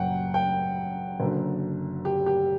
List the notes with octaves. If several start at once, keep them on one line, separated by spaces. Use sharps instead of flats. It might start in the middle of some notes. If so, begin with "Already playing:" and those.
Already playing: F#1 F#2 F#3 F#5 G5
G5
F#1 F#2 D3
G4
G4